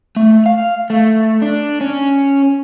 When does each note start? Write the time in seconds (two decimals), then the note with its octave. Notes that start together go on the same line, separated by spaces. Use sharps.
0.16 A3
0.46 F5
0.90 A3
1.42 D4
1.81 C#4